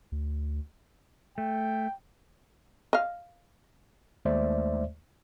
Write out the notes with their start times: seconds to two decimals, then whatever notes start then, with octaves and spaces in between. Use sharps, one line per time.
0.12 D2
1.38 A3 G5
2.93 D#5 F5
4.25 D#2 G#3 A3 C5 D5 E5